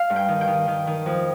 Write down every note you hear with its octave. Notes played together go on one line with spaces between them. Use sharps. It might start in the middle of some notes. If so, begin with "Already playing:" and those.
Already playing: F5
G2
G5
D#3
G5
D#3
D#3
D#3
F2